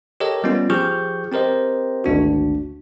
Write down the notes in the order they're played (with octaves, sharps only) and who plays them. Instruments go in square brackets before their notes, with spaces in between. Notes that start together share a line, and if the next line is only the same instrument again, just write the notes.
[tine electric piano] G4 A4 A#4 C#5 D#5
G3 B3 C#4 F4
F3 G4 G#4 C#6 F6 G6
C4 G4 A#4 C5 D#5
G#1 D2 D4 F#4